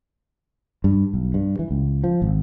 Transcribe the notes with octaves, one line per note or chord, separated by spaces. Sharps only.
G2
B1
G2
E3
C#2
F3
G#1